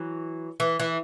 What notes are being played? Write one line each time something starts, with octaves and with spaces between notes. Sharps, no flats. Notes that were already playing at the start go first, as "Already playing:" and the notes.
Already playing: E3 F#3
E3
E3